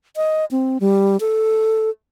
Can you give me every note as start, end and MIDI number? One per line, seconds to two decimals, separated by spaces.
0.16 0.45 75
0.51 0.78 60
0.80 1.20 55
1.20 1.90 69